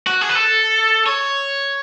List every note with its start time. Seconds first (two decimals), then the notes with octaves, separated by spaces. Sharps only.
0.07 F#4
0.21 G#4
0.29 B4
0.35 A4
1.06 C#5